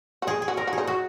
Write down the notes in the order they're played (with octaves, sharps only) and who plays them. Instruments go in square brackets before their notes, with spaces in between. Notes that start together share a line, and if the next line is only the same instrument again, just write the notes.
[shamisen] F#4
[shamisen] D#4 [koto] G#4
[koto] G#4
[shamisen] F#4
[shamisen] D#4 [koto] A#4
[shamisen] F#4
[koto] G#4
[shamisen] D#4
[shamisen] F#3 [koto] F#4